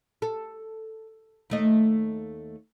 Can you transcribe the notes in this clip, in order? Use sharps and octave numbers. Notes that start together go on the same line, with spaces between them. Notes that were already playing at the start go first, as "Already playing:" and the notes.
A4
D#2 A3 D#5